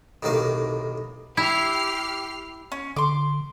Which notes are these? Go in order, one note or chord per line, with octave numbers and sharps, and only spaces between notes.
B1 A2 C3 D#3 A#3 F5
E4 G4 F6 C7
C#4
D3 C6 D6